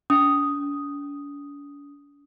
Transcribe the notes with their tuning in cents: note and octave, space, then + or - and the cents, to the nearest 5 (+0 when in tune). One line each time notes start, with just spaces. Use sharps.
D4 -45 D#6 +0